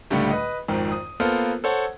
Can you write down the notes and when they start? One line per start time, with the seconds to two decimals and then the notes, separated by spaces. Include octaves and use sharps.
0.10 C#2 A2 D3 G3 A3
0.31 B4 D#5
0.68 G#1 F2 G#2 D#3
0.92 D#6
1.20 A#3 B3 F4 A4 A#4 C5
1.64 A4 C5 C#5 F#5